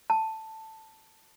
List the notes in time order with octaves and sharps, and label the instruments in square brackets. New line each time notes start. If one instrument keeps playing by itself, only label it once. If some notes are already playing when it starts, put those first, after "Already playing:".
[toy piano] A5